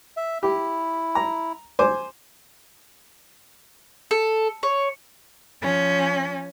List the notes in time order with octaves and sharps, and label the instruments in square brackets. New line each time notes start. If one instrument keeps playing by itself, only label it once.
[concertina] E5
[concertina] E4 [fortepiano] G4
[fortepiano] A#5
C5 G#5 D6
[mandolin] A4
C#5
[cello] F3 C#4